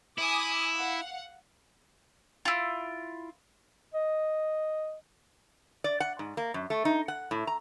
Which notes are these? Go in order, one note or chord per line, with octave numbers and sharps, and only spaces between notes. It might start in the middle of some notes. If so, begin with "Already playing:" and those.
E4 G#5 D6 D#6
F5 F#5
E4 F4
D#5
D5
F#5
G#2
A#3
F#2
A3
D#4
F#5
A2
A#5